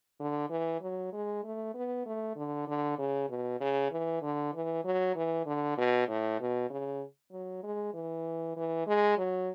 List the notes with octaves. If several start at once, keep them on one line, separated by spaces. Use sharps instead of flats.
D3
E3
F#3
G#3
A3
B3
A3
D3
D3
C#3
B2
C#3
E3
D3
E3
F#3
E3
D3
B2
A2
B2
C#3
F#3
G#3
E3
E3
G#3
F#3